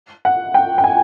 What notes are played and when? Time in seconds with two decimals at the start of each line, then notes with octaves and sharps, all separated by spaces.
0.25 F#5
0.54 G5
0.78 G5
0.84 G#5